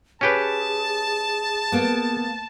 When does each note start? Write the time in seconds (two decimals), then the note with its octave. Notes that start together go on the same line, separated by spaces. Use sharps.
0.21 C#4 G4 G#4 B4 A5
1.72 A#3 B3